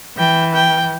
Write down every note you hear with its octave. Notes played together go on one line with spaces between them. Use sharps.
E3 G5
G5